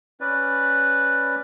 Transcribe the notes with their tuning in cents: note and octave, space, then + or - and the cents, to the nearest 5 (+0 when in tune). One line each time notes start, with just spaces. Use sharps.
C#4 +0 B4 +0 D5 +5